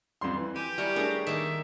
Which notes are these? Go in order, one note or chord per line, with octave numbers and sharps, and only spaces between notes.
F2 G3 C6
E3
G4 G#5
G3 E4 G#5 A#5 C#6 F6
A3 D4 G#4 A#4 C#5 A#5
D#3 A#3 D#4 E5